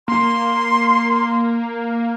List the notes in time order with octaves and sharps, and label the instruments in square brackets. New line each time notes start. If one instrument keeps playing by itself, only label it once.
[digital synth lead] A#3 [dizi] C6